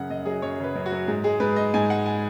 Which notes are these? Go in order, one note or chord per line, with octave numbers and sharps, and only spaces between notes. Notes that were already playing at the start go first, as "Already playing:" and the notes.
Already playing: F#2 C#3 F#5
F#2 D#5
F#3 G#4
F#2 C#5
C#3 B4
F#2
F#4
F#3
G#2 G#4
G#3 G#4
G#2 B4
D#4 D#5
G#2 G#5
G#3 F#5
G#5